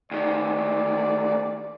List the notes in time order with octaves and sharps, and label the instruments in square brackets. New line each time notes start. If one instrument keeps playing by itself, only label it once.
[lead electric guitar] D2 D#3 [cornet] D5